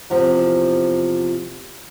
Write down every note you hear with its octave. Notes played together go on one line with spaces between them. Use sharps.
E2 C3 F3